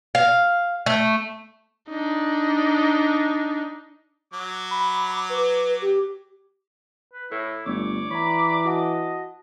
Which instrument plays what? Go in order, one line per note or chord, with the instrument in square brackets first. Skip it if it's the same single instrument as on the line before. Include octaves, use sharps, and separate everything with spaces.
[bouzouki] F5
A3
[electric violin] D4 D#4
[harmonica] F#3 D6
[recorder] B5
B4
G4
[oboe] B4
[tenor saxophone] A2 [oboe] E4 [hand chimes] A4
[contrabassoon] G1 [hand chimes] A3 [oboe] C#5 [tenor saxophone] D5
[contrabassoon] E3 [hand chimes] A#5 C#6 [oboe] B5
[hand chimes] F#4 F#5 A5 [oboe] D#5